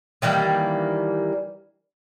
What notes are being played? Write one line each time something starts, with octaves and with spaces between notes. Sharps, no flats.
D#3 E3 G3 A#3